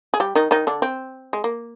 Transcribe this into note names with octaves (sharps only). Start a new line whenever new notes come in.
G#4
G3 G4
D#3 D#4
D#3 D#4
D3 D4
C4
G#3
A#3